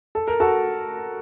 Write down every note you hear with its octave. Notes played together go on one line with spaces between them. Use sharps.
A4
A#4
F#4 A4